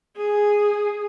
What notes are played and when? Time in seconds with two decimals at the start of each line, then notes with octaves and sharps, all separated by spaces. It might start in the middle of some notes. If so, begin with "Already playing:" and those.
0.17 G#4